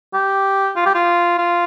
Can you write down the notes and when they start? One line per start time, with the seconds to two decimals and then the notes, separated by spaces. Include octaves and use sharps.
0.14 G4
0.76 F4
0.86 G4
0.95 F4
1.38 F4